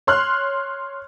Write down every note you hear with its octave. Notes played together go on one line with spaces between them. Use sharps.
C#5 C6 F6 F#6